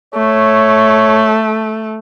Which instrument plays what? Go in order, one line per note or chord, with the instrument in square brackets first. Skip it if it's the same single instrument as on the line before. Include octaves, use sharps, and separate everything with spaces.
[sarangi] A3 [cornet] C#5